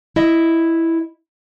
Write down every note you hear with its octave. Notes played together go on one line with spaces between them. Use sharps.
E4 D#5 E5